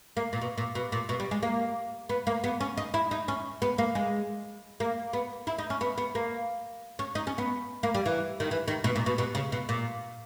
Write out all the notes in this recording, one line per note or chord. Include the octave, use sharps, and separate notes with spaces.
A#3
A#2
B2
A#2
B2
A#2
B2
G3
G#3
A#3
B3
A#3
B3
C#4
D#4
E4
D#4
C#4
B3
A#3
G#3
A#3
B3
E4
D#4
C#4
B3
B3
A#3
C#4
D#4
C#4
B3
A#3
G3
E3
D#3
E3
D#3
B2
A#2
B2
B2
C#3
B2
A#2